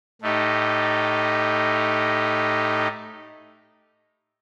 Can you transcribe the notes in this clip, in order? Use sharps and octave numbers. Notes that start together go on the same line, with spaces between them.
A2 A3 D#4 G4